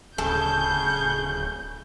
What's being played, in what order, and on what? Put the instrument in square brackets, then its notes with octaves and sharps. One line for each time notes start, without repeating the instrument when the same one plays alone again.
[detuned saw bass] D1 [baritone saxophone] C#3 [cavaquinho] A4 [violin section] G6